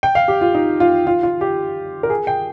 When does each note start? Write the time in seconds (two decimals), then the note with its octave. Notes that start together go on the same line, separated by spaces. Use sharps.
0.03 G5
0.15 F5
0.28 G4
0.41 F4
0.55 D#4
0.80 F4
1.07 F4
1.23 F4
1.41 G4
2.03 A#4
2.10 G#4
2.27 G5